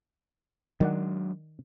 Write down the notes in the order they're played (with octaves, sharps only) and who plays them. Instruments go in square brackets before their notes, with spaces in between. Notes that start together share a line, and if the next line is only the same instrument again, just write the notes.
[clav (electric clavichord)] D#3 D5 F#5 [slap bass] F#3 G#3 D4